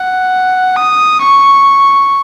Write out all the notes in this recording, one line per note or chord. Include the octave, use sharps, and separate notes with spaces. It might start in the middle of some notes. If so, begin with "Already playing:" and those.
Already playing: F#5
D#6
C#6